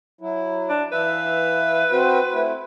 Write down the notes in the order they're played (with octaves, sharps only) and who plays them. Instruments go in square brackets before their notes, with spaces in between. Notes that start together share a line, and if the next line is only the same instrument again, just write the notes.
[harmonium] F#3 E4
[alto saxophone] D4
[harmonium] E3 E5 F5 [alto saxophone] B4
[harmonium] C4 F#4 C5
A3 E4